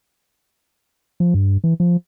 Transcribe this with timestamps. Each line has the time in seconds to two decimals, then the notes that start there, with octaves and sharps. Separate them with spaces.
1.20 F3
1.34 G2
1.64 E3
1.80 F3